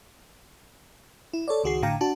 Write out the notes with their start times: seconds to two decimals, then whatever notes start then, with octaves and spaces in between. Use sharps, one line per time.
1.33 E4
1.48 A4 C#5 D5
1.64 C#2 D#3 F#4 G#4 C7
1.82 G#1 A2 D3 F5 G5 A#5
2.01 D4 F#4 A5